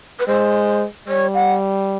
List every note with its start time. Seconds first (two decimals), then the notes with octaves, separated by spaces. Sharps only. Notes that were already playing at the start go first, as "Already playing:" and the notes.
0.20 B4
0.27 G#3 C5
1.08 G3 C#5
1.34 F#5